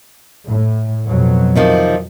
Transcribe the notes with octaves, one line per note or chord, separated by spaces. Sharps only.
A2
F2 B2 F#3
C3 D#3 F3